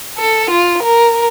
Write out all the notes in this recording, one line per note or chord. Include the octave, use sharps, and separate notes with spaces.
A4
F4
A#4